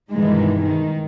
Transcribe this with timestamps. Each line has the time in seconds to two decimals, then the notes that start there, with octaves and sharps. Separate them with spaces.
0.11 G2 B2 D#3 E3 G#3 D#4
0.63 D#3